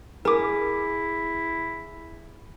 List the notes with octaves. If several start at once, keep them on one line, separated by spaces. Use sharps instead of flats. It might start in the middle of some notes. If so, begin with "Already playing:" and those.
E4 G#4 A#4 D6